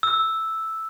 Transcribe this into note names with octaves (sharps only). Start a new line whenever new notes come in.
E6